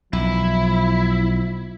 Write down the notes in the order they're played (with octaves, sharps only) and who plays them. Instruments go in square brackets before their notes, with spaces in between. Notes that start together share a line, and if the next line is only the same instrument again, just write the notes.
[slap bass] B1 [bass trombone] F3 [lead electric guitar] E4